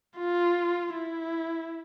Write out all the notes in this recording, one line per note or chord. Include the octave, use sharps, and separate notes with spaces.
F4
E4